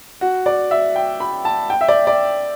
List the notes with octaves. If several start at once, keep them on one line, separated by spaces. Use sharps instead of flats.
F#4
D5
E5
G5
B5
A5
G5
E5
D5
D5